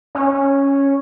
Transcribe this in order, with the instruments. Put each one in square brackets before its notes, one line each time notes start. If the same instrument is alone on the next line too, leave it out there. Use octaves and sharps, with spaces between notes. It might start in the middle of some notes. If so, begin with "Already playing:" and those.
[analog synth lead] C#4